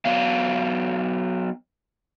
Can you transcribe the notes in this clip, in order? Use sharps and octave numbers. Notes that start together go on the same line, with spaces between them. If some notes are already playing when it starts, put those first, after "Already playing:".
F#3 B3 F5